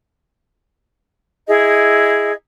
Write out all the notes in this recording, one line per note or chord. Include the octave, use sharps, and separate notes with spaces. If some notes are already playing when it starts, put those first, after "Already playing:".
E4 G#4 D#5